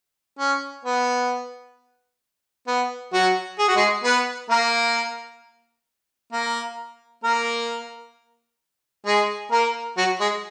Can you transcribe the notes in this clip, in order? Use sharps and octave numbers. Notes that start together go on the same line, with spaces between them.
C#4
B3
B3
F#3 F#4
G#4
F#4
G#3 G#4
B3 B4
A#3 A#4
A#3 A#4
A#3 A#4
G#3 G#4
A#3 A#4
F#3 F#4
G#3 G#4